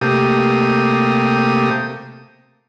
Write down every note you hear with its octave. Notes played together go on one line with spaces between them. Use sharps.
C3 A3 A#3 G4 D#6